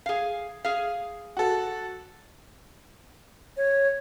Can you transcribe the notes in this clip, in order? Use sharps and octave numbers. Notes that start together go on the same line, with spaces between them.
G#4 F5
G#4 F5
F#4 A4
C#5